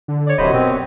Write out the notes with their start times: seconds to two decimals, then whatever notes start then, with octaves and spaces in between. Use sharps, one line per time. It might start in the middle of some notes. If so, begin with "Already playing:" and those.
0.08 D3
0.27 C#5 D5
0.39 D1 F#2 C3 F#4 C5 D#5 B5
0.53 B2 C4